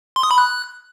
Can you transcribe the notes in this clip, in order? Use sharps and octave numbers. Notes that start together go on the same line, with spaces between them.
C6
D#6
B5
F#6